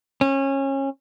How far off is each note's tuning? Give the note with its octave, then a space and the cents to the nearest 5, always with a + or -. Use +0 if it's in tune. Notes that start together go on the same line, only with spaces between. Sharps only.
C#4 -25